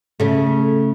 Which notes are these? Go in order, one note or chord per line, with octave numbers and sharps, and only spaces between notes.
C#3 A3